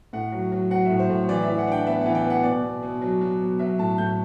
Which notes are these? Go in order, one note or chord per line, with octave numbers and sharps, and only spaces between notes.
A2 F#5
F#3
F#3
F#3 F#5
A2 E5
C5
A2
E3 D5
E5
E3
F#5
D4 G5
B3 E5
E3 F#5
G5
B3
F#5
B2 D5
B2
B2
F#3
F#3
B2
F#3 E5
A2 A5
A2 G6